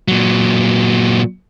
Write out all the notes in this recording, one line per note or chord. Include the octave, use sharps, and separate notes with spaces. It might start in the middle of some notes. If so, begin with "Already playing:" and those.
A#2 F#3